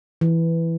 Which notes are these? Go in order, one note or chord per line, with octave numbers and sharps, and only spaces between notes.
E3